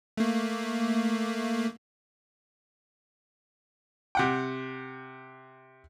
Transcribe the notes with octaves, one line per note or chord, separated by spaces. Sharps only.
A3 A#3
C3 F#5 G5